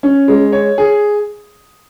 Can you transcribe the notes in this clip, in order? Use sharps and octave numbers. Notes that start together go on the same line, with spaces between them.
C#4
G#3
C#5
G#4